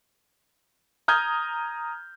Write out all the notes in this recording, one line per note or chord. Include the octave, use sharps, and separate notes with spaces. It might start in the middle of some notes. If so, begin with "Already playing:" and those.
A#5 D#6 F6 G6 G#6